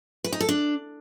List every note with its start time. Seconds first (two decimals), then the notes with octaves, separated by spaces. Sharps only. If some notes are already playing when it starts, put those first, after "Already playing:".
0.24 B4
0.32 D#4
0.41 A4
0.49 D4